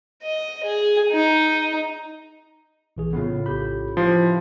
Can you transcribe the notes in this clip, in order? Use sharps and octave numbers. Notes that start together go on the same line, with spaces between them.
D#5
G#4
D#4
A#1 E3 G#4
A2 C#3 B3 F4
A#1 G4 B5 G6
F3 E4 G4 B4 C6